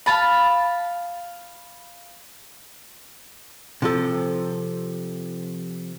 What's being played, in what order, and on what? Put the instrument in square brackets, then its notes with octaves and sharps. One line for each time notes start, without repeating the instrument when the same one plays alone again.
[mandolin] F5 A5 B5
[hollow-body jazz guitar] C3 F3 A4